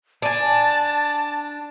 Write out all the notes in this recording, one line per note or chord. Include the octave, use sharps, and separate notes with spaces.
D4 G#5 A5